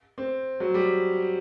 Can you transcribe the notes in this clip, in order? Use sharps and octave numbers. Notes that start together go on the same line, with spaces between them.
C4
F#3
G3